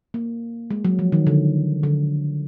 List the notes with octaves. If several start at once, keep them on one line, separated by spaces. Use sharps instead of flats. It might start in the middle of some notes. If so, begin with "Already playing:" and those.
A#3
G#3
F#3
F3
D#3
D3
D3